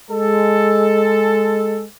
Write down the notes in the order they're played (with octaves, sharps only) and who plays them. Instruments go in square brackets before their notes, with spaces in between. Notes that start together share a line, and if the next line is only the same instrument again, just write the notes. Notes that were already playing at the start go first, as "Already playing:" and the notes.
[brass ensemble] G#3 A4